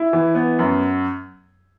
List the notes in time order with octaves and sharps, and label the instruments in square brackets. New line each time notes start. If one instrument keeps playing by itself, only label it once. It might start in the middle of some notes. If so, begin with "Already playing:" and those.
Already playing: [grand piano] E4
E3
B3
F#2